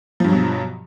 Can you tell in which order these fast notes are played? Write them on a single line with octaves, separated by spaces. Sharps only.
F3 G2 F#3 B2